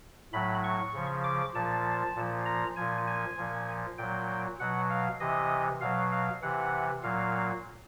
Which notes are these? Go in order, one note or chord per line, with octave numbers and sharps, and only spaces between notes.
A2 F#3 B5
C#6
C#3 F3
D6
A#2 F3 A5
A#2 F3
A#5
A#2 F3 G#5
G#5
A#2 F3
A#2 F#3 G5
B2 F#3 F#5
F5
C3 E3 D#5
B2 F#3 F5
F5
C3 E3 F#5
A#2 F#3 F5